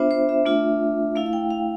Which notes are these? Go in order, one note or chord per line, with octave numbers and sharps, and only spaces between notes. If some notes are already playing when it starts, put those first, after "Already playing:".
Already playing: B3 D4 F4 C5 E5
C5
E5
A3 D4 F4
A3 E4 F5
F5
G5
F5